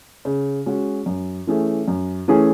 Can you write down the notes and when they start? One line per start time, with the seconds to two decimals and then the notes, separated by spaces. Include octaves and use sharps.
0.25 C#3
0.66 G#3 C#4 F#4
1.06 F#2
1.47 E3 A3 C#4 G#4
1.88 F#2
2.28 E3 A3 C#4 G#4